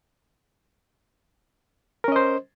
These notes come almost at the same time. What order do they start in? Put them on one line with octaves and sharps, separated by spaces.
A#4 C#4 D#5 C5